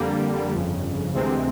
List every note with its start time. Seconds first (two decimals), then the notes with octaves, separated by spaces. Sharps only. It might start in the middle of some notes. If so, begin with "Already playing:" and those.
Already playing: F2 D3 G3 A#3
0.52 G1 F2 C#3
1.14 D2 C3 E3 G#3 C4